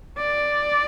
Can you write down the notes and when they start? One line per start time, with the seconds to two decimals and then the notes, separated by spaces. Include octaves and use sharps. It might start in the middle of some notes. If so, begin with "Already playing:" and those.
0.18 D5